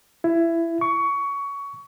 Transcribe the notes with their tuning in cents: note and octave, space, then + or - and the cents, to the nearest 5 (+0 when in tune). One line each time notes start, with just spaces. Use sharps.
E4 +20
C#6 +20